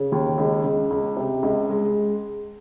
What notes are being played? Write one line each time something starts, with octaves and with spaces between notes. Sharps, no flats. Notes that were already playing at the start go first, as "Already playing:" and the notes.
Already playing: C#3
D#2
C#2
C#2
C#2
C3
C#2
G#3